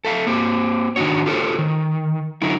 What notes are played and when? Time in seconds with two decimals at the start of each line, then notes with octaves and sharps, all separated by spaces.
0.05 A4 E5 F5
0.27 A#3 C4 G4
0.96 D#3 D4 D#4 F#4 C#5
1.26 F4 G4 A4 A#4 C5 C#5
1.59 D#3
2.42 D3 F#3 D#4 E4